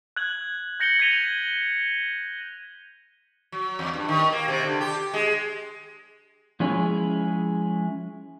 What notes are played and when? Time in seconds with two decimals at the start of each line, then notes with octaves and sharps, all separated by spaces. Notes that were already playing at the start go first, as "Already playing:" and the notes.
0.16 F#6 G#6 F#7
0.80 G6 A#6 C#7 F#7 G7
0.99 G#6 A#6 B6 D#7 F7 G7
3.52 F#3
3.79 E2
3.93 G2
4.09 D#3
4.32 A#3
4.48 C3
4.63 D3
4.81 G4
5.14 G#3
6.60 F3 G#3 C#4 E4 G#4 C#5